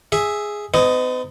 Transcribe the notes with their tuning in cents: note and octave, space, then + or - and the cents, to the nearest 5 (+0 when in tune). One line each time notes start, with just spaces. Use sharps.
G#4 +0 E5 +0
B3 +45 D#4 +0 D#5 +0